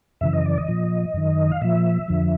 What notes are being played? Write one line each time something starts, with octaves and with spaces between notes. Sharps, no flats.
F#2 C#3 E3 E5
D#5
D5
D#5
A#2 F3
F#2 D#3
F5
A#2 F3 E5
F2 D3 F3